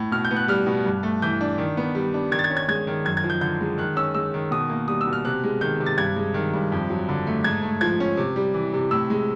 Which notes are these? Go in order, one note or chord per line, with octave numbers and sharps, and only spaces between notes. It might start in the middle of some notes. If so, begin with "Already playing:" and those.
Already playing: A2
B2 F6
G6
B3
F#6
G3 F6
B2
G2
A3
E3 G6
D4
D#3
B3
G3
D4
D#3 G#6
A6
G#6
C#4
G#6
G#3 G#6
D#3
F#2 G#6
G#6
F3
G6
D3 G6
G#3
D#3 F#6
C#4 E6
G#3 E6
D#3
B2 D#6
A#3
G3 D#6
E6
B2
F6
C3 F#6
G#3
D#3 G6
C3
A6
G2 G#6
G#3
D#3
G2
F2
F#3
D3
A3
G#2 G#6
A3
F3 G#6
C#4
C3
G3
E3
C3
A2 E6
G#3